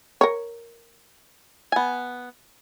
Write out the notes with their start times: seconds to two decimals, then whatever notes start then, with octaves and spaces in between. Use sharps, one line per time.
0.21 A#4 C#5
1.72 B3 G#5